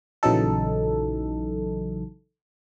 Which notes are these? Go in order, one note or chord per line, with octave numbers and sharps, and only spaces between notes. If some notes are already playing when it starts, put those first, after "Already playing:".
A#1 C#3 E3 F#3 D#4 A4